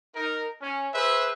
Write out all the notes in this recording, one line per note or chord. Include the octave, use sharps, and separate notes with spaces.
D#4 A#4
C#4
G#4 B4 C5 E5